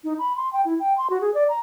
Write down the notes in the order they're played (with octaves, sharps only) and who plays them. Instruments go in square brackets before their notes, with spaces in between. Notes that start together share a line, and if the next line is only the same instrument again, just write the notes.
[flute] D#4
B5
C6
G5
E4
G5
C6
F#4
G#4
D5
A#5